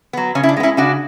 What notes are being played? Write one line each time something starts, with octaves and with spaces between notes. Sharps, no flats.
F#3 B3
C#3 C#4
E4
D4
G#3 B3
C#4 E4
C#3 D4 F#4